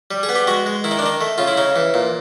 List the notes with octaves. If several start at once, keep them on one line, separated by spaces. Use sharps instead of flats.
G3
G#4
B3
G4
G#3 F#4
G#3
D#3 E4
D#4
D4
D#3 D#4
A3
C#3 F4
E4
C#3 D#4
E3
A#2